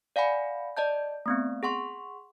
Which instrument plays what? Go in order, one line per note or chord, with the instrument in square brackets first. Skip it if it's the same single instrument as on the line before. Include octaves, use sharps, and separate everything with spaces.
[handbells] D5 F5 F#5 G#5 B5
D5 D#5 A5 G6
A3 B3 C4
G#4 F#5 C6 C#6